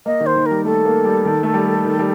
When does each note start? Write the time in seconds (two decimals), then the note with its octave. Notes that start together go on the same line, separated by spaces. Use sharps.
0.06 A#3 D#5
0.21 D#3
0.26 C5
0.36 D#3
0.46 G3 A#4
0.65 A3 A4
0.85 A#3
1.05 G3
1.25 D#3
1.43 A3
1.54 G3
1.85 D#3
1.99 G3